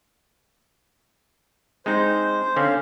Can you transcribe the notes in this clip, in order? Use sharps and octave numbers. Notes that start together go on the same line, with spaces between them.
G#3 C4 D#4 C5
D3 C4 C#4 F5